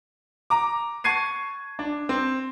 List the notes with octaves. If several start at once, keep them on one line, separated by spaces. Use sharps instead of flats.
A#5 D6
A5 C#6 G#6 C7 D#7
D4
C4